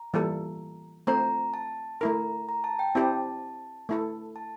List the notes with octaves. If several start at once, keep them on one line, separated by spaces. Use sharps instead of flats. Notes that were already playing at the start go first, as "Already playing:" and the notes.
Already playing: A#5
E3 G3 A#3 F4 A4
A3 C4 F4 C5 A#5
A5
A3 E4 A#4 A#5
A#5
A5
G5
C4 E4 G4 C5 A5
A3 E4 A4
A5